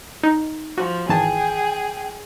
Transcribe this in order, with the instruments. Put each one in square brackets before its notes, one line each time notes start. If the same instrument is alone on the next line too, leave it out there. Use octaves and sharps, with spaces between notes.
[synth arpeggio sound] D#4
[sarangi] F3 [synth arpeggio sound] F#4
[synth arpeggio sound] G#1 E3 A5 [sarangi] G#4 [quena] G5